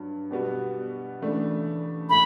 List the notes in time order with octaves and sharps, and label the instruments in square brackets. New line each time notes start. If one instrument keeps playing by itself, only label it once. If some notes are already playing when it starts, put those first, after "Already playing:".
Already playing: [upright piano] G2 F#3
B2 G3 B3 F#4
C#3 E3 A3 D4
[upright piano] A2 [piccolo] B5